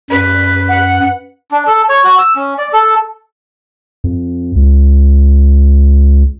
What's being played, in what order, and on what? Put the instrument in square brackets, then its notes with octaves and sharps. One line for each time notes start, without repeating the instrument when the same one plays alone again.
[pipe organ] F#2 [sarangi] B4
[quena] F#5
[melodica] D4
A4
C#5
F#4
E6
C#4
D5
A4
[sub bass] F2
C#2